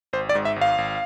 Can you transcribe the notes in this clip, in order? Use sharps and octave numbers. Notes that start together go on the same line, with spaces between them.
G#1 C5
D5
G#2
E5
G#1
F5
G#1